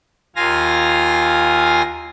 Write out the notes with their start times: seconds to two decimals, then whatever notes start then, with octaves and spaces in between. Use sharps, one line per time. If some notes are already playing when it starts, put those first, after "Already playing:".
0.36 D#2 F4 F5 G#5 A#6